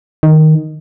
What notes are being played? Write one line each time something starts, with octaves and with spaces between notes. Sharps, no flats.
D#3